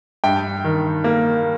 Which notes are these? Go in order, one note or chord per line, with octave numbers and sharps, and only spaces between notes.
G2 G5
D#3
A#3